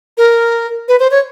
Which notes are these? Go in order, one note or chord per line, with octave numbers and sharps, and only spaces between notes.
A#4
B4
C5
C#5